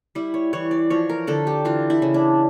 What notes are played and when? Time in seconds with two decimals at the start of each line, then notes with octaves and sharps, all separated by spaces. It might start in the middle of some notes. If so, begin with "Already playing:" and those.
0.15 G3 E4
0.34 C#5
0.53 E3 C#5
0.71 D5
0.90 F3 C#5
1.09 A#4
1.27 D3 A4
1.47 G4
1.65 E3 F4
1.90 E4
2.02 C#3
2.14 D4